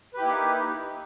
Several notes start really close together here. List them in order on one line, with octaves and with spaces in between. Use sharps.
B4 G4 E4 A#3 D#4